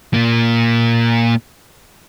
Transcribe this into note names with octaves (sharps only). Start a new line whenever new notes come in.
A#2 A#3